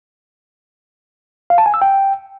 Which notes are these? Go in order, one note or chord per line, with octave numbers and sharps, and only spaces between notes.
F5
A5
G#5
E6
G5